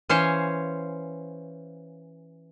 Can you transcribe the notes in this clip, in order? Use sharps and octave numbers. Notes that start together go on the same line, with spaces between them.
E3 C#4 C5 C#5 F5